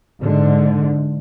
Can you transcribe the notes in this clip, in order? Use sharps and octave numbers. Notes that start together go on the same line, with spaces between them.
G#2 D3